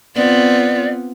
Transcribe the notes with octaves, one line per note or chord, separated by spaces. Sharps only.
B3 C4 F4 D5